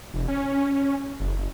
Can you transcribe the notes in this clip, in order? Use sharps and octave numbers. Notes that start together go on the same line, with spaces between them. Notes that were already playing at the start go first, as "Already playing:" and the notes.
F1
C#4
F#1